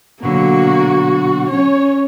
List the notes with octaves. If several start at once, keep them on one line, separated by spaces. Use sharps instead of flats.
B2 D3 F#3 A#3 F#4
C#4 C#5